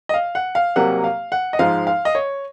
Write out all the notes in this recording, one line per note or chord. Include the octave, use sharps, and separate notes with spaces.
D#5
F5
F#5
F5
C2 C3 F#3 A#3 F#5
F5
F#5
D#5
G#2 F3 G#3 F5
F5
D#5
C#5